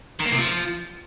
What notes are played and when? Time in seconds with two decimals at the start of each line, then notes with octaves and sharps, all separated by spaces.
0.20 D#3
0.26 A#3
0.32 C3
0.38 F3